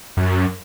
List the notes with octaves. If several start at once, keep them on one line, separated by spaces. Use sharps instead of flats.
F#2